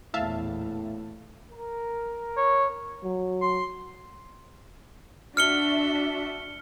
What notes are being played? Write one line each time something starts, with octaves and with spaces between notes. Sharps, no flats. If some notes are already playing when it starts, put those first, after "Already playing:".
A#1 E2 A2 E5 F5 A5
A#4
C#5
F#3
C6
D4 F#4 E5 F6 C#7 G7